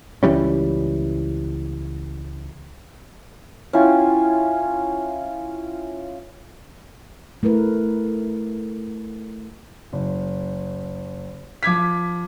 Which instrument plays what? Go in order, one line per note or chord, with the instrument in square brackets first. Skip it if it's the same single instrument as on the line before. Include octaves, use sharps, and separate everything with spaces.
[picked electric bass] C#2 E3 G3 C#4
[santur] C#4 E4 F4 G5
[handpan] A3 E4 A#4 B4
[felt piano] F#1
F3 D6 G#6 B6